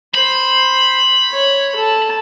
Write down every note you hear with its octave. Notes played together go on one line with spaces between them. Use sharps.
C5 B5
C#5
A4 A5